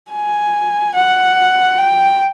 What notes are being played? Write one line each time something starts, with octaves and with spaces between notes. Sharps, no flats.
G#5
F#5
G5